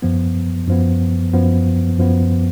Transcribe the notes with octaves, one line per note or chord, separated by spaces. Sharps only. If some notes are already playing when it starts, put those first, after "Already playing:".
F#2 F3 B3
F#2 F3 B3
F#2 F3 B3
F#2 F3 B3